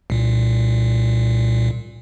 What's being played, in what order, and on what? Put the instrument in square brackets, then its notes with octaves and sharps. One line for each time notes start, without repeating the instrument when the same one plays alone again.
[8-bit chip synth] C2 A#2